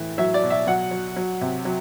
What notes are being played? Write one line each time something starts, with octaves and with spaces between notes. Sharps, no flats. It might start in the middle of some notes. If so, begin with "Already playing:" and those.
Already playing: A2 E3
F#3 E5
D5
B2
E5
F#3 F#5
F#3
F#3
C3
F#3